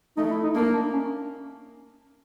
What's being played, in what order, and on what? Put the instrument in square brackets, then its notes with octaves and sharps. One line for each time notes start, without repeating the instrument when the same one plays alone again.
[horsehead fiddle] A3 [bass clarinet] D#4
[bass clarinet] E4
D#4
[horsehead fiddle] A#3 [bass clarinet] D4
[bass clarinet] D4
C#4